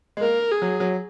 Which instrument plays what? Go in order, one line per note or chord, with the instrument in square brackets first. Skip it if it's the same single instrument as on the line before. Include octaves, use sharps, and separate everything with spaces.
[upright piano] G#3
[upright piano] A#3 [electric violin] A#4
[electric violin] G#4
[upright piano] F#3
F#3